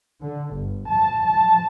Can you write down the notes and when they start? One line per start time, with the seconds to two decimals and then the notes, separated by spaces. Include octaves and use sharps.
0.25 D3
0.54 G1
0.91 A5
1.25 A5